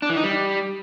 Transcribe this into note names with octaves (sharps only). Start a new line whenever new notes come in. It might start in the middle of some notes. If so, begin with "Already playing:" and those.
D4
E3
D#4
G3